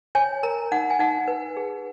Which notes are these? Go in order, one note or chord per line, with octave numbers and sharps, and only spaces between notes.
C#5 G#5
A#4 A#5
D#4 F#5
G#5
D#4 F#5
B4
G#4